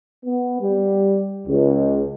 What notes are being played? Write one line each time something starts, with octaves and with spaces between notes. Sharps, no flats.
B3
G3
C#2